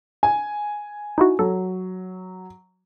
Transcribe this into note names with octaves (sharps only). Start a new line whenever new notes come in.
G#5
D#4 E4 F#4
F#3 A4